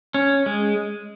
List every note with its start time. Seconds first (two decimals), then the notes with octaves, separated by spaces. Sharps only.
0.14 C#4
0.46 G#3